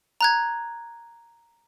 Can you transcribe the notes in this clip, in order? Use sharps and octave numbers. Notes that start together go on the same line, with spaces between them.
A#5 F#6 G#6